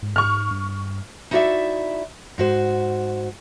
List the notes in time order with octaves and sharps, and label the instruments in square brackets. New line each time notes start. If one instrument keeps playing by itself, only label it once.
[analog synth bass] G#2
[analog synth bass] G#2 [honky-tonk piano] C#6 F6
[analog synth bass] G2
[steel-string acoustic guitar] D#4 E4 F#4 A4 D5 E5
G#2 F#4 C5